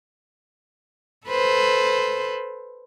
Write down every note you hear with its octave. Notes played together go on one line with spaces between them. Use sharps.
A4 B4 C5